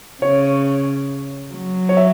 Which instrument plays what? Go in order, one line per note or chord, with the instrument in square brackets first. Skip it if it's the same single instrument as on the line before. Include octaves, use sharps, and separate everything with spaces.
[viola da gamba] C#3 [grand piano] C#5
[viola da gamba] F#3
[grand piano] C#5
E5